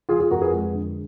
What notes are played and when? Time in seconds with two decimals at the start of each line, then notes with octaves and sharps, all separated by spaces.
0.09 F3 F4 G#4
0.19 F4 G#4
0.30 F2 F#4 A#4
0.41 G#4 B4
0.53 G#3
0.74 D3